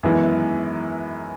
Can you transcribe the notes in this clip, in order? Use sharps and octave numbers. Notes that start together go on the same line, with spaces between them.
F#2 D#3 E3 G#3 B3 E4